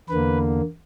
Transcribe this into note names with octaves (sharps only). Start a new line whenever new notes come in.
E2 D3 A#3 B4